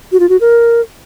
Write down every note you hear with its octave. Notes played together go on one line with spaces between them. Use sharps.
F#4
F4
F#4
A#4